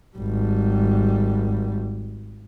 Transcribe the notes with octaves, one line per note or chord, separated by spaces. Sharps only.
G#1 G3